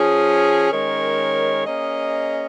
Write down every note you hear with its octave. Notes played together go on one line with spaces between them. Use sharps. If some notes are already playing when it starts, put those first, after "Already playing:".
Already playing: F3 C#4 G#4
D#3 G#3 C#4 A#4 C#5
A#3 C#4 G#4 D#5